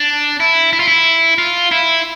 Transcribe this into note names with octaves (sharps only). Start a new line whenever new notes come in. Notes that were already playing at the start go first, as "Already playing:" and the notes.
Already playing: D4
E4
E4
F4
E4
F4
E4